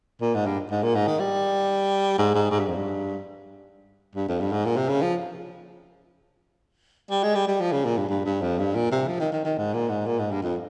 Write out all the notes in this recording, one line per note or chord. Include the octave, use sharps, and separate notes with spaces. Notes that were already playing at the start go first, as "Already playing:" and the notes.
A#2
G#2
G2
G#2
A#2
G#2
D#3
G3
G#2
G#2
G#2
G2
F2
G2
G2
F2
G2
G#2
A#2
C3
C#3
F3
G3
G#3
G3
G3
F3
C#3
A#2
G2
G2
G2
F2
G2
A#2
C3
F3
D#3
D#3
D#3
G#2
A#2
G#2
A#2
G#2
G2
F2